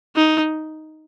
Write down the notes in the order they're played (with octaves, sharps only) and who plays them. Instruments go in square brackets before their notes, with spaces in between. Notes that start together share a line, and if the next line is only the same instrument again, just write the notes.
[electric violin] D#4